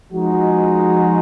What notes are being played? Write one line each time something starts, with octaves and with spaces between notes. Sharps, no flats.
F3 G#3 D#4 F#4